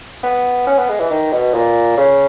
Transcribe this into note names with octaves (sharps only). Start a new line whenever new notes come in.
B3
C#4
B3
G#3
E3
D#3
B2
A#2
C#3